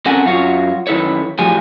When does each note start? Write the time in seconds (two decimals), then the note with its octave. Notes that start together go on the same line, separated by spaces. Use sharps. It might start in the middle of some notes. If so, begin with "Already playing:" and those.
0.06 C4 C#4 A4 A#4 F#5 G#5
0.26 F#2 F4 F#4 C#5
0.87 F#2 D#3 E4 A4 B4 C#5
1.39 A2 F3 F#3 G#3 G4 G#5